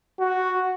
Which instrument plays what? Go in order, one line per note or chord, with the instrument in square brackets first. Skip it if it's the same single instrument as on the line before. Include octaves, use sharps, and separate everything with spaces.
[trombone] F#4